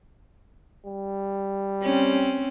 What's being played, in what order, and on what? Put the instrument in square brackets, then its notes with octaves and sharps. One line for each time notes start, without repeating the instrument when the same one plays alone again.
[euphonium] G3
[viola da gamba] C4 C#4